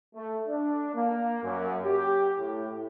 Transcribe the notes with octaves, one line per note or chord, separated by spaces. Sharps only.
A3
D4
A#3
F#2
G4
A2